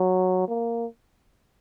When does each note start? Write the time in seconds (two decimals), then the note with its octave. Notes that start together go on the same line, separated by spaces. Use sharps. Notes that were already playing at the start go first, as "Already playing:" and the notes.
Already playing: F#3
0.48 A#3